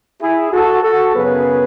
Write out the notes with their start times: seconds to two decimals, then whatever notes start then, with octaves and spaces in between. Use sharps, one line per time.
0.21 E4 G#4
0.52 F#4 A4
0.83 F#4 A4
1.14 F#2 C#3 F#3 B3 G#4 B4